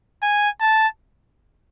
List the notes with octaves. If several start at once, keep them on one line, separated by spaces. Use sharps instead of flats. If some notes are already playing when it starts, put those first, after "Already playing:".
G#5
A5